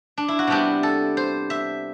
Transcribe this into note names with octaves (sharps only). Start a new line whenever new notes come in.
D4
E4
F#4
C3 G3 B3 D4 G4
A4
C5
E5